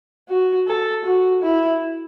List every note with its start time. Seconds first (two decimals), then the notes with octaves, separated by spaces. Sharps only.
0.29 F#4
0.67 A4
1.05 F#4
1.42 E4